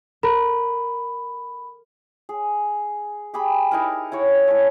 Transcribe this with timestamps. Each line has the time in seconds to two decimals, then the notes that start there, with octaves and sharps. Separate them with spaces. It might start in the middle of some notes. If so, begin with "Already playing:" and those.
0.23 A#4 B5
2.29 G#4
3.34 G4 G#4 G5 B5
3.72 D#4 E4 A#4
4.12 E4 A#4 C#5 F#5
4.48 A3 C#4 E4